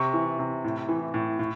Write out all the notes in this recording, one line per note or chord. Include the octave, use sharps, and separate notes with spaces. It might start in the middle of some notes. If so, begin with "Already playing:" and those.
Already playing: C3 C#6
E3
C3
A2
E3
A2
A2